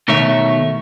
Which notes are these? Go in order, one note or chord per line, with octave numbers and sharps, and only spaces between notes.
B2 D#3 A3 C#5 E5